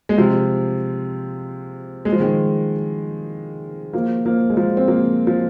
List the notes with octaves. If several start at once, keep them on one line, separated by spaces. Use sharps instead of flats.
G#3
C3 F3
G#3
F3
D#3 G#3
F3 A#3
F3 A#3
G#3
F3 A#3
C4
F3 A#3
F3